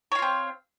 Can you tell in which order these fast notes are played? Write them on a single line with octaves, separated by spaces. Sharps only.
C#5 F5 F4 C4